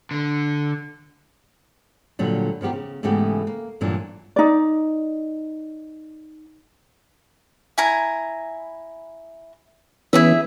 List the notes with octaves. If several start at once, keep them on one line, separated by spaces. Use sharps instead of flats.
D3
A#2 D3 F#3 G3
D#3 F3 B3 G4 A#4
C#3
G#2 C#3 E3 A3 B3 G4
A#3
G2 A#2 E3 F#3 A#3 D4
D#4 D5
E4 G#5 A#5
E3 B3 C#4 E4 G#4 E5